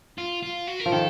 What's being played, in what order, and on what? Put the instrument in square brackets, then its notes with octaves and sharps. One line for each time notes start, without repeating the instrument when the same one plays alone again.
[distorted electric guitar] F4
F4
F#4
A#4
[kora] F3
[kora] D#3 [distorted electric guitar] A4